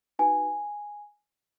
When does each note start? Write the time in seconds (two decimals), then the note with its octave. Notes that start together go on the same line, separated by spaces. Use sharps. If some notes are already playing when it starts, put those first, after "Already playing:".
0.19 D#4 F#4 B4 G#5